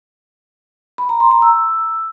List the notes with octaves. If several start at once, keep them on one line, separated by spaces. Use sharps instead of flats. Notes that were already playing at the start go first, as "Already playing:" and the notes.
B5
A#5
C6
A#5
E6